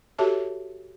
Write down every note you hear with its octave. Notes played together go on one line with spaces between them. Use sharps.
F#4 G4 A4 C#5 E5 A5